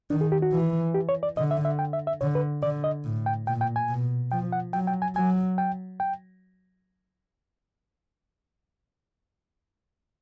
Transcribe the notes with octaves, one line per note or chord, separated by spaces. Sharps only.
D#3 D4
G#4
G4
F#4
E3
G4
C#5
D5
D3 D#5
E5
E5
G5
E5
E5
D3 C#5
B4
D3 D5
D#5
A2
G5
A#2 G5
G5
G#5
B2
F3 G5
F#5
F#3 G5
G5
G#5
F#3 G#5
G5
G5